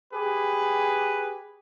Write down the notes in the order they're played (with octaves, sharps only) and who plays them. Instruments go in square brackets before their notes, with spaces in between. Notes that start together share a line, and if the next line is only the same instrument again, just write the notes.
[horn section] G4 G#4 B4